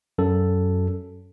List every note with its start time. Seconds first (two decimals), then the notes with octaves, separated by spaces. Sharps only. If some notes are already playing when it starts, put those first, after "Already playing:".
0.18 F#2 A4